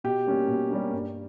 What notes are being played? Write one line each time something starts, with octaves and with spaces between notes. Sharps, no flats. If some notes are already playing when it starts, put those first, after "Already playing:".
B2 G4
G3 A#3 C#4
B2
G3 A#3 C#4
G2